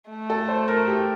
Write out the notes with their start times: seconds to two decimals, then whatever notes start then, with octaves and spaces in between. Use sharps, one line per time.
0.10 A3
0.30 A4
0.49 C5
0.68 A#4
0.87 G4